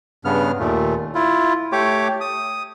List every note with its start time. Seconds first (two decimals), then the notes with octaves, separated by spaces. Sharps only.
0.25 G2 C#3 B3 F6
0.60 D#2 A#2 A3
1.15 E4 F4
1.72 A3 G4 C#5 D6
2.21 D#6